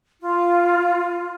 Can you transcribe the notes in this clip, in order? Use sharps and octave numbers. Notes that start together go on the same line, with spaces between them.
F4